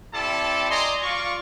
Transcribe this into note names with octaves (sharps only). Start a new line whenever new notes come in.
C4 E4 G4 A4 D5 A5
D5 D#5 G#5 A#5 C6
F4 D5 C#6